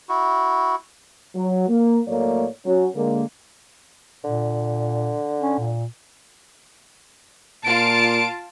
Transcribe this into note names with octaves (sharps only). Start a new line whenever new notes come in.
E4 F#4
F#3
A#3
A2 F#3 A3 A#3 C#5 D5
F#3 C#4
D3 G#3 A#3
A#2 D3
C#4
A#2
A#2 F4 A5 D7